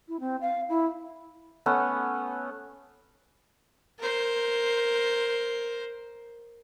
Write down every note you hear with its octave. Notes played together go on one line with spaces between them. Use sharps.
E4
C4
F5
E4
A3 B3 C#4 F#5
A#4 C5